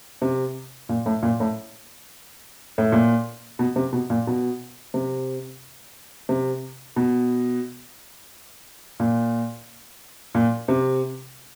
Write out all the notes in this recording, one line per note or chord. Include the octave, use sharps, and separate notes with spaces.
C3
A#2
A2
A#2
A2
A2
A#2
B2
C3
B2
A#2
B2
C3
C3
B2
A#2
A#2
C3